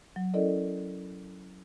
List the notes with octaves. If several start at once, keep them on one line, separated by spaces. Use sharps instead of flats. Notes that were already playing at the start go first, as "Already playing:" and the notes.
F#3
C#4 E4 A4 A#4 D5 D#5